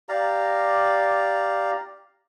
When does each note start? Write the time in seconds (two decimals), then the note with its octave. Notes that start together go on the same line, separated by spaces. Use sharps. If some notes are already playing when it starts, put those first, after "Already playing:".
0.09 G4 D5 F5 A#5